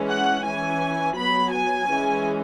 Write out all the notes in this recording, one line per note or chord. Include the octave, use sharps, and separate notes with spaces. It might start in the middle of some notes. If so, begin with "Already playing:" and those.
Already playing: E3 G#3 C#4
F#5
E3 C#4 G#5
F#3 B3 B5
G#5
E3 G#3 C#4